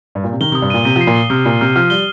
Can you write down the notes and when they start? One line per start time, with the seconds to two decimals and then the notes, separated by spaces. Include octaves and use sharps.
0.15 G2
0.24 A#2
0.32 C3
0.40 D#3 G7
0.52 C3 D#6
0.62 G2
0.70 A#2 D#7
0.85 C3 D#7
0.96 F3 C7
1.07 A#2
1.15 G7
1.30 C3 F6
1.46 A#2 F6
1.61 C3 F6
1.76 F3 F6
1.90 G3 G7